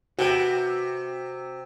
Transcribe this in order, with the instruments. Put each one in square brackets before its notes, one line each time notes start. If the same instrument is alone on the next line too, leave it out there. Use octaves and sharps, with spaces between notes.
[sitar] C3 [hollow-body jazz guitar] F#4 B4 G5